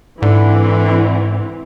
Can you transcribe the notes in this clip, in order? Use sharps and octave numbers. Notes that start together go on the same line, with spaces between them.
G#2 D3 E3 C4